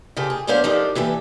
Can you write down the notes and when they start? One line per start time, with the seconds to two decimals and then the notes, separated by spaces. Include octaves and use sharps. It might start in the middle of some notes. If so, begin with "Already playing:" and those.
0.17 C#3 G4 A4 C5
0.30 G#4
0.47 F#2 B3 C#4 D4 C5 F5
0.64 F3 D4 D#4 G4 A4 A#4
0.95 A#2 E3 G4 A4